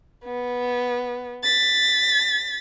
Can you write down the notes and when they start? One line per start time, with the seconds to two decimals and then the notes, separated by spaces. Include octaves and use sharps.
0.25 B3
1.44 A6 B6